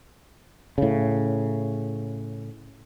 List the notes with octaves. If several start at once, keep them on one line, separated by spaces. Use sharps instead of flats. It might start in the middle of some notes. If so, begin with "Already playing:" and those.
A2 C#3